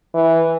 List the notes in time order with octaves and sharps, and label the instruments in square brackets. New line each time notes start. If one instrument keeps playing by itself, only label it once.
[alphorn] E3